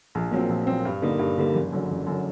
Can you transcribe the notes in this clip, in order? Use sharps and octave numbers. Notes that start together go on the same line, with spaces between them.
A#1
A#2 F#3 C4
A#1
A#2 F#3 C4
G2
D3 G3 A#3 D#4
G2
D3 G3 A#3 D#4
F#1
F#2 D3 F#3
F#1
F#2 D3 F#3